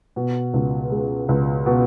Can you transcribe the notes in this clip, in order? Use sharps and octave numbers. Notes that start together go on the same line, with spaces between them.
B2
C#2
G#3
C#2
B2